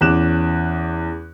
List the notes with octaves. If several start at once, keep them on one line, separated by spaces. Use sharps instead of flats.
E2 C#4 D6 F#6 E7